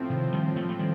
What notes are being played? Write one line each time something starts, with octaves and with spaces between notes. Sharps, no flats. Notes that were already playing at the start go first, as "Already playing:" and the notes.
Already playing: A2 F3 C4
C3 D#3
D#3 G3
F3 A3
A3
D#3 G3